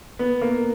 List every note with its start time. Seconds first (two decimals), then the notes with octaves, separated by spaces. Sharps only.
0.19 B3
0.41 A#3